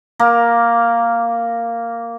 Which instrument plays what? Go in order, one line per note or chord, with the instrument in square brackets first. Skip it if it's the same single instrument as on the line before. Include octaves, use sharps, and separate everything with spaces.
[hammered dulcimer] A#3 A#4